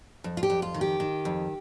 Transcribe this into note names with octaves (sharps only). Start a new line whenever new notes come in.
F2
F4
G4
F2
F4
D#3
G4
D#3
F2